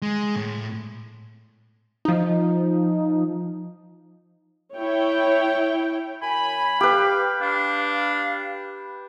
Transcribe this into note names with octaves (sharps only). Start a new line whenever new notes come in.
G#3
A2
F3 D#4
E4 C#5 G5
F#2 G#5 B5
G4 B4 F5
D4 F5